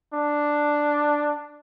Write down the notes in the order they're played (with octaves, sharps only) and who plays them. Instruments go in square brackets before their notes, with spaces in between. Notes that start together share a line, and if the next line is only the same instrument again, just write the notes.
[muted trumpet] D4